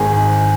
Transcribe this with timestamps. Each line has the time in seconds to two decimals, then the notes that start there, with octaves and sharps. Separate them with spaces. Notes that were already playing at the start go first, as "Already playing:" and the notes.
Already playing: G#1 G#2 D#3 G#4